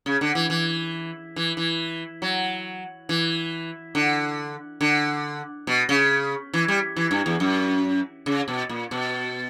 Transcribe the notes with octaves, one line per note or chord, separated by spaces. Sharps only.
C#3
D3
E3
E3
E3
E3
F#3
E3
D3
D3
B2
C#3
E3
G3
E3
G2
E2
F#2
C#3
B2
A#2
B2